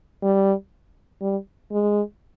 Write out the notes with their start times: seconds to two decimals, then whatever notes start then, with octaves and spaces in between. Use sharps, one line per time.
0.23 G3
1.21 G3
1.71 G#3